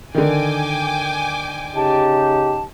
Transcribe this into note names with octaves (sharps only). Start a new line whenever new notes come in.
D3 D#3 G5 G#5 D6
C#3 D#4 G4 A5